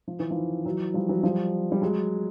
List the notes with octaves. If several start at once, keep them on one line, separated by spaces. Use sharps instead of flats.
F3
E3
D#3 F3
E3 F#3
F3 G3
E3 F#3
F3 G3
G3
F#3 G#3